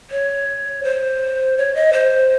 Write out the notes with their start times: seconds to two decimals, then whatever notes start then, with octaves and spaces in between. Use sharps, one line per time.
0.10 C#5
0.83 C5
1.57 C#5
1.75 D#5
1.93 C5